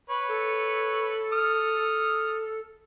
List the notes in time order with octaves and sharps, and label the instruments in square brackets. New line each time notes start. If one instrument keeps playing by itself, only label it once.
[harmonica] B4 C#5
[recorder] A4
[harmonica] D#6 F6